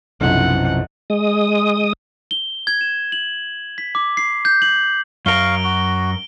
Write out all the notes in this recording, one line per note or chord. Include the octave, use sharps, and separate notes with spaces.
B1 F#2 C3 E3 F3 F#5
G#3 D#6
G7
G#6
E7
F#7
B6
D6
C7
G6
F#7
F#2 A#4 F5 C#6 D7 G7
F#4